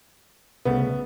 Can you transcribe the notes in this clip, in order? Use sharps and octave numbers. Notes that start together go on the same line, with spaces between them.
C2 C#3 A3 B3